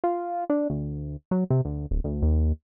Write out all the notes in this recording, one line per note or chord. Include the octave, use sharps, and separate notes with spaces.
F4
D4
D2
F#3
C3
D2
D1
D2
D#2